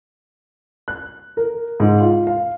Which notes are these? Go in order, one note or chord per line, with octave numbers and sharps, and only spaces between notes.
F#6
A#4
G#2
F4
F5